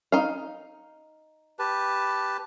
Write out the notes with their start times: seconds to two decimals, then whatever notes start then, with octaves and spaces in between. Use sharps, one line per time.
0.12 D#4 F5
1.59 G4 B4 A5